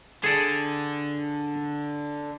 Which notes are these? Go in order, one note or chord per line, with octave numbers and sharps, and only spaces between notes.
D3 G#4 A4 D5